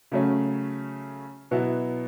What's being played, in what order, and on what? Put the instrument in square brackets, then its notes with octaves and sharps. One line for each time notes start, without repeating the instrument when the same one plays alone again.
[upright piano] C#3 F#3 A3 C#4
B2 F#3 B3 E4